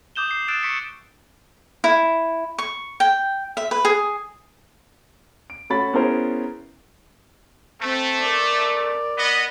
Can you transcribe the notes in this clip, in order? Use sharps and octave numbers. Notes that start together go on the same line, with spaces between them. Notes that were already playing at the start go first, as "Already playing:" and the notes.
D6 D#6 G6 E7 G7
C7
D#6 E6 F#6 A6 D7 E7
C#6 B6 C#7 D7
E4
C#6
G5
E5
B4
G#4
D7
A3 C#4 F#4 C#5 B5 A6
B3 C#4 E4 G#4 A#4 C5
A3 C4
A#4 D5
B3 D#5